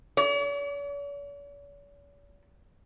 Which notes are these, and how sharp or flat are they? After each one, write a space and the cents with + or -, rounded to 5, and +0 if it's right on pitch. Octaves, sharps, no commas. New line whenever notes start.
C#5 +45